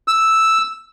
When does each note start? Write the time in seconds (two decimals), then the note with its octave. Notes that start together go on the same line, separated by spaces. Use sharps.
0.08 E6